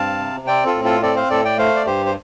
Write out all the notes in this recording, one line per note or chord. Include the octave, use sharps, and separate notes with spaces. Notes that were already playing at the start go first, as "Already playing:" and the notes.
Already playing: G2 C4 F5 A5
C3
C4 D5 G5
F4 A4
A2
F4 A4
C4 A4 D5
C5 F5
A2 A4 D5
D5 G5
A3 C5 F5
D5
G2 G4 C5
C5